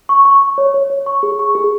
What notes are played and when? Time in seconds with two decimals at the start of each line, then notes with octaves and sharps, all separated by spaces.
0.09 C#6
0.25 C#6
0.42 C#6
0.58 C#5
0.74 C#5
0.90 C#5
1.06 C#6
1.23 G#4
1.39 C#6
1.55 G#4